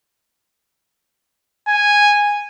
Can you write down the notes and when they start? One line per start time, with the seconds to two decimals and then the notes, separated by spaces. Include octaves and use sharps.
1.68 G#5